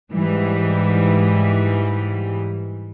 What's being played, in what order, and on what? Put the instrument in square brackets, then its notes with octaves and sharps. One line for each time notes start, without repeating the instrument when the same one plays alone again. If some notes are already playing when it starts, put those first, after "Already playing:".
[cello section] G#2 E3 G3